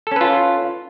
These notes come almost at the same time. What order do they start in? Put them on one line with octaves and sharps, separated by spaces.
A4 C#4 B4 F4